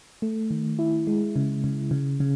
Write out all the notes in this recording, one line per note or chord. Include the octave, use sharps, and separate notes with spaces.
A3
D#3
E4
G#3
C#3
C#3
C#3
C#3